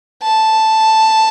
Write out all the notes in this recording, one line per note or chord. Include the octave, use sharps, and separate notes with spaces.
A5